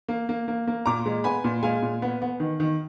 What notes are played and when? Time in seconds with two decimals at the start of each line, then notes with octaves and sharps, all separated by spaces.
0.08 A#3
0.29 A#3
0.48 A#3
0.67 A#3
0.86 A#2 A#5 D6
1.06 G#3
1.24 B3 G#5 B5
1.44 A#2
1.63 G#3 F5 G#5
1.82 A#2
2.02 B3
2.22 B3
2.40 D#3
2.60 D#3